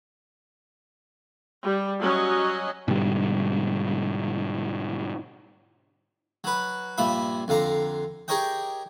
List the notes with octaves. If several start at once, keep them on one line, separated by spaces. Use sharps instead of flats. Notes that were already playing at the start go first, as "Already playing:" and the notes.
G3
F#3 C#4 D#5
G#2 B2 D3 G3
F#3 B4
G2 A#2 F3 E5 B5
F2 D3 F5 A#5 C6
G4 G#4 A#4 C#5 D#5 G5